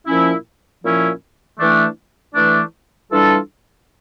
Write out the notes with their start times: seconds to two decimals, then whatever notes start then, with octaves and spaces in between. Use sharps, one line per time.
0.06 A#2 F3 C#4 E4
0.82 A#2 F3 C#4 E4
1.58 E3 A3 D4
2.34 E3 A3 D4
3.10 E3 G3 D4 F4 A4